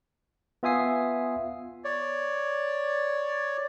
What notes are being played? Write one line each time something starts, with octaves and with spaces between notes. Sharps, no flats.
B3 F4 E5 G#5 D#6 C7
C#5 D5